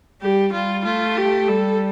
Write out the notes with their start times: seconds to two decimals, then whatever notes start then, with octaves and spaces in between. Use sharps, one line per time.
0.22 G3 G4
0.53 G3 F4
0.85 A3 F4
1.17 G4
1.48 G3 A4